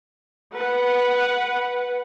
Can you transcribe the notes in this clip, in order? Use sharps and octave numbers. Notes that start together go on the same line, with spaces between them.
B4 F#5